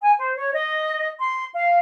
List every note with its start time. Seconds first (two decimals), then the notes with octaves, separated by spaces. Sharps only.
0.02 G#5
0.18 C5
0.37 C#5
0.53 D#5
1.20 C6
1.54 F5